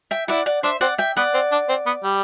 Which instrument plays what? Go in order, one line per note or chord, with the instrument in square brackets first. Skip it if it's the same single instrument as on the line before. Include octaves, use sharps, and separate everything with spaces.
[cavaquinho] E5 G5
[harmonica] E4 [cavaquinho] D5 F#5
[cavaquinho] D5 F#5
[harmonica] D4 [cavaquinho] C5 E5
[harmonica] C4 [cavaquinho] D5 F#5
[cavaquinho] E5 G5
[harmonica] B3 [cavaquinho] D5 F#5
[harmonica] C4
D4
C4
B3
G3